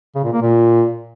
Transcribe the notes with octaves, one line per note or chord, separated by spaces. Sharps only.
C#3
A#2
A#3
A#2